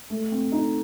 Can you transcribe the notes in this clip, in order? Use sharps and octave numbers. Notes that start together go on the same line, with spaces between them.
A3
C4
D#4